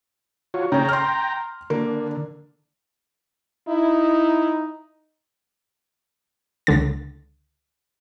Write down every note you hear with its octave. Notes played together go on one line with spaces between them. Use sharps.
F4 F#4 C#5
C#3 C#4 G5 A#5
C6 F6
D3 A#3
D#4 E4
C#2 D3 A6